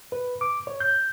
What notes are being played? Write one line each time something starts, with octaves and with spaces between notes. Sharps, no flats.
B4
D6
C#5
G6